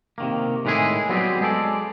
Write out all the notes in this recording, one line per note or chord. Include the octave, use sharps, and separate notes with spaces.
C3 D#3 A#3
A2 D#3 G#3 E4 G#4
F#3 G3 B3 C4 G4 G#4
G#3 G#4 A4 D5